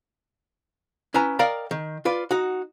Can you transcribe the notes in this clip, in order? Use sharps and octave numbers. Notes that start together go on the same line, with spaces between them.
C#4 E4 B4 G#5 A#5
A#4 D5 D#5 F5 G5 A#5
D#3
F4 B4 D5
D#4 F#4